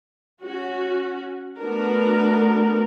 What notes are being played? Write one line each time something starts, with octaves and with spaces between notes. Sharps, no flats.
C#4 F#4
A3 B3 D4 F#4 A#4